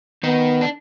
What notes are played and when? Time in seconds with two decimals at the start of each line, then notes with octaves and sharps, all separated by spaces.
0.23 D#3 B3 D#4
0.61 D4